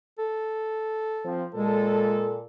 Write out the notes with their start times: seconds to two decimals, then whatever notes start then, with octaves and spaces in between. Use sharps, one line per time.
0.19 A4
1.25 F3 C4
1.55 A#2 G#3 A4